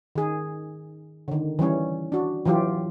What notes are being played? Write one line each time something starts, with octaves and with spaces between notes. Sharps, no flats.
D#3 G#4
D3 D#3
E3 G3 C#4 C#5
D4 F#4
E3 F#3 F4 G4